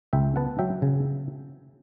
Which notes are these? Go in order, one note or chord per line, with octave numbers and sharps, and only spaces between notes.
C#2 E5 G5
B3 F#5 A5
F#3 E5 G5
C#3